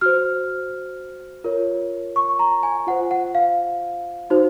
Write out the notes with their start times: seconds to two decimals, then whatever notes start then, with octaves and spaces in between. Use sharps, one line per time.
0.01 F#4 C5 F6
1.44 F4 A#4 C#5
2.16 C#6
2.39 A#5
2.63 G#5
2.87 F4 C5 F#5
3.11 F#5
3.35 F5
4.30 D#4 F#4 C5